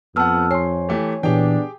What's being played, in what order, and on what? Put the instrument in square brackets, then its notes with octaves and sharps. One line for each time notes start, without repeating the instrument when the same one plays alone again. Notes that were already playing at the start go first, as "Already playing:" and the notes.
[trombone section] F2 [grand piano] B3 F#5 [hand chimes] A5 E6 F6
[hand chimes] C#5 G#5 [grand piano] C6 C7
[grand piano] E3 A3 G4
[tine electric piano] A#2 E3 [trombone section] B3 D4 [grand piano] G4 G#4 G5